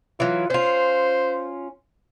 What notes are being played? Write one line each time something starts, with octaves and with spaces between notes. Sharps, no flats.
E3 F#3 F4
C#4 F4 C5